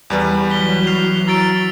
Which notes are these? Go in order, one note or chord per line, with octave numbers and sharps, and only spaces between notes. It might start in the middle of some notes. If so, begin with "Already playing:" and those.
E2 G3 B4
E3 F#3 F#4 B6 G7
F6 C7 F7
A#5 E6 A6 D7